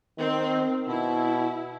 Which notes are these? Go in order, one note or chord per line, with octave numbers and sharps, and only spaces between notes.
D#3 C4
B2 E4